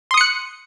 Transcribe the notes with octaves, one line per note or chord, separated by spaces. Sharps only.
C6 D#6 F#6 C#7